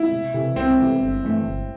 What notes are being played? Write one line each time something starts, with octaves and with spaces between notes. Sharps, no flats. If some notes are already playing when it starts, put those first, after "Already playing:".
Already playing: E4
C2
C3 E3 A3
C2 C4
C3 E3 A3
G1
G2 E3 A3
G1